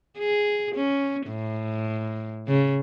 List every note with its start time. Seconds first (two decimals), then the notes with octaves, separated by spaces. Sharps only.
0.19 G#4
0.75 C#4
1.28 A2
2.48 C#3